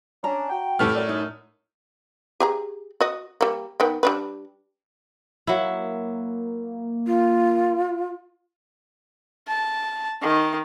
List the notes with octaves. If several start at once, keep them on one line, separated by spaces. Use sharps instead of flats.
C#4 D4 A#5
F#4 G5
A2 A3 G4 A4 B4 F6
F#2 D5
D#4
G4 G#4 A#5
F#4 D#5
G3 A#3
D#3 B3 G5
G3 D4 B4
F#3 A#3 E4
F4
A5
D#3